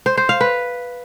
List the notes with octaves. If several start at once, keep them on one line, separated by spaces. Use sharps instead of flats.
C5
C5
F5
B4